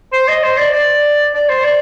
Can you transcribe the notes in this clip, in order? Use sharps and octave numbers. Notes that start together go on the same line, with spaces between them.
C5
D#5
C5
D5
D5
D5
C5
D5